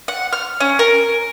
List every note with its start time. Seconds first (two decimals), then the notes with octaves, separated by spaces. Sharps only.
0.08 F#5
0.33 F6
0.60 C#4
0.79 A#4